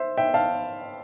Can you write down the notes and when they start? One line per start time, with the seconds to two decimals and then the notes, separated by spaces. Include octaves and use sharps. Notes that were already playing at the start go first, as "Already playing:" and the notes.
Already playing: C5 E5
0.18 E5 G5
0.34 F5 A5